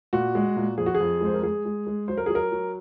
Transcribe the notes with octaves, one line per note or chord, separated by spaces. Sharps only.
A#2 F#4
G#3
A#2
F2 G#4
F#4
G#4
F2
G#3 C5
A#4
G#3 G#4
G#3
G#3
F#3 C5
A#4
F#3 G#4
A#4
F#3